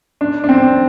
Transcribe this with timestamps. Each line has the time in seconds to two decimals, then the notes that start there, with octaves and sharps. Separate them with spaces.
0.21 D4
0.44 D4
0.49 C4